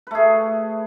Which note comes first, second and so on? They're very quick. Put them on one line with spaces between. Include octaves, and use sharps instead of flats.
B4 A3 G#4